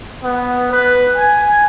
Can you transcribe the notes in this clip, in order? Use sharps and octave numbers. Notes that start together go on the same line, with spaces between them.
B3
B4
G#5